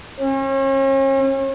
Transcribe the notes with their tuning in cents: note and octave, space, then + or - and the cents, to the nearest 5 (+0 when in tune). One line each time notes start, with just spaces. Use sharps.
C#4 -40